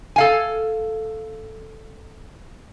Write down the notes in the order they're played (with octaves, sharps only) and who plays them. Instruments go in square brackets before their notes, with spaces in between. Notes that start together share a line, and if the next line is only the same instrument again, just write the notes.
[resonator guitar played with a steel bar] A4 F5 G#5